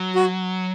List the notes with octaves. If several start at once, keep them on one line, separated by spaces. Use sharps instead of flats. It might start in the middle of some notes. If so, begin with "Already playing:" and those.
Already playing: F#3
F#4